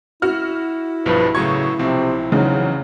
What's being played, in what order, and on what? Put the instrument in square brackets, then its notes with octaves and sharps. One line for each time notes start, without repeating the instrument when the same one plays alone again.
[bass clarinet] E4 [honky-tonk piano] F#4 F6
[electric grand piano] B1 G2 F3 [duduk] B4
[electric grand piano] A2 F#3 G#6 [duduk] C#3 [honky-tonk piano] C#6
[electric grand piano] B1 F3 C4 [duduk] C3
[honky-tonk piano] E2 C#3 D#4 [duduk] F#3